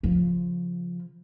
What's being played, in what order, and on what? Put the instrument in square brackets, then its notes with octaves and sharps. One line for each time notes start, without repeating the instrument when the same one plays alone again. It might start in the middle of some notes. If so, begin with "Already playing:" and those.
[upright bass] C#3 F3